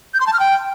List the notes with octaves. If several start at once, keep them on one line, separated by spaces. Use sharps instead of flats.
G6
C6
A5
F6
G5